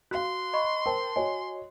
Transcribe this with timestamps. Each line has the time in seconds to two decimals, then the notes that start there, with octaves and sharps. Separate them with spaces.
0.11 F#4 F5 C6 F#6
0.53 D#5 B5 C#6
0.86 A#4 C5 G5 A5
1.16 F#4 C#5 D#5 G#5